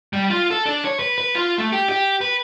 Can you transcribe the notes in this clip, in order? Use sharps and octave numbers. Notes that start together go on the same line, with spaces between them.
G3
F4
A4
D4
C#5
B4
B4
F4
A3
G4
G4
B4